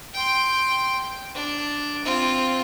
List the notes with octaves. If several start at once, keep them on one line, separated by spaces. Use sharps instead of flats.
G5 C6
D4
C4 F4